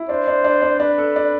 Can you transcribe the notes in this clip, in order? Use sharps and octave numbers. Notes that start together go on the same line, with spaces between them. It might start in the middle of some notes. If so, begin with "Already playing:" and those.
Already playing: E4
D4 C5
D4
D4
D4
D4 B4
A4
D4